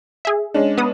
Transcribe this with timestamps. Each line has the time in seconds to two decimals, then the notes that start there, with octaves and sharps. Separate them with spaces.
0.25 G#4 E5
0.54 G#3 C#4 D4
0.78 B3 D#6